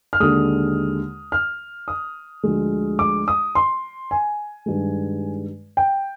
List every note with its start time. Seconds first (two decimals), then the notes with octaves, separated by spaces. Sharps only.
0.13 F6
0.20 D#2 D3 G#3 D#6
1.32 F6
1.88 D#6
2.43 D2 D3 F3 G#3
2.99 D6
3.28 D#6
3.55 C6
4.11 G#5
4.66 G2 D#3 G#3
5.77 G5